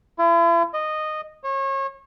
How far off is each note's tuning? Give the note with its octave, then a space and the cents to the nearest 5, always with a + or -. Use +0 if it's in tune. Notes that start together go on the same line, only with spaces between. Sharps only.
E4 +40
D#5 -15
C#5 -35